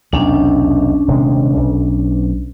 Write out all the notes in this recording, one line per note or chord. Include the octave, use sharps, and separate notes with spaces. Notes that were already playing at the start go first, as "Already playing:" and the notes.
B1 E2 C3 C#4 D4
D#1 C3 G#3
B1